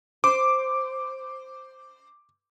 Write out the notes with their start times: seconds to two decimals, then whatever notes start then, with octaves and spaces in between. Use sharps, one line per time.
0.24 C5 D6